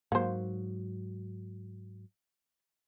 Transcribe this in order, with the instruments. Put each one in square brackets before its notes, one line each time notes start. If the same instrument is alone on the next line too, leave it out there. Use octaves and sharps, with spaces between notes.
[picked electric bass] G#2 F#3 [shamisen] A#3 C5